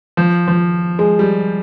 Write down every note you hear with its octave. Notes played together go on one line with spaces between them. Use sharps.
F3
F3
G#3
G3